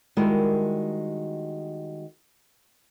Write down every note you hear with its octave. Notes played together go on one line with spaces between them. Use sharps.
D#3 G3 G#3 E4 F#4 A#4